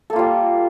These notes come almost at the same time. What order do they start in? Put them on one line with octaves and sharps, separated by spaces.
A4 A#3 F4 G3